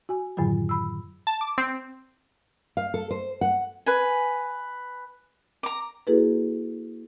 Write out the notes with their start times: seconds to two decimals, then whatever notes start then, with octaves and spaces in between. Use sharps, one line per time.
0.09 F#4 G#5
0.37 F#2 A2 D3 D#3 F#3
0.69 B5 E6
1.27 A5
1.41 D6
1.58 C4
2.77 F5
2.94 A4
3.11 C5
3.41 F#5
3.86 B4 G#5
5.63 A#5 D6
6.07 A#3 E4 F#4 G#4 A4 B4